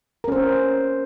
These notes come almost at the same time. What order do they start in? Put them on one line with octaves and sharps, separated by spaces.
A#4 C#4 C5